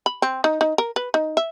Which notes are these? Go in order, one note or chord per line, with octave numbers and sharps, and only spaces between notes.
B5
C4
D#4
D#4
A#4
B4
D#4
E5